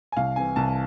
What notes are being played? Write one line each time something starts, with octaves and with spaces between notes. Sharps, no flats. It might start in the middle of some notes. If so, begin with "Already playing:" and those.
G#5
C2 F5
C3 E3 G#5
C2 A5